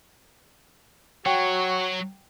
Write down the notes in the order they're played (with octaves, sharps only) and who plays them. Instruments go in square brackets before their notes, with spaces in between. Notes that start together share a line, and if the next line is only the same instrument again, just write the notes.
[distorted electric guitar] F#3 [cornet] F#4 [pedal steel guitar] C#5 [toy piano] F#5 G5